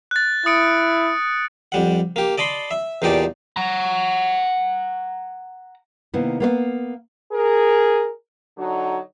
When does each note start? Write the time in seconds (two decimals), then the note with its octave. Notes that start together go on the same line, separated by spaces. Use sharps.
0.11 F#6 A6
0.46 E4 D#6 C#7 D7
1.72 F2 G3 F#5
2.16 A#3 G4
2.38 D5 D#5 A5 B5 C6
2.71 E5
3.02 E2 A#2 D#4 G4 D5 A5
3.56 F#5 A#5
6.14 C3 D#3 A#3 B3 E4
6.40 A#3 B3 C5 F5
7.32 G#4 A#4
8.58 D3 F#3 D#4 F#4